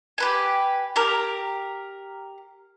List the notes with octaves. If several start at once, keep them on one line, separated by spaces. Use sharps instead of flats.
G4 B4 G#5
G4 A#4